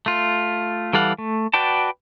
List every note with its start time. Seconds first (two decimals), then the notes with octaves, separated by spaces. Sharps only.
0.06 A3 F4
0.93 E3 G3 A4 F5 F#5
1.18 A3
1.53 F#4 B4 D5 G5 A5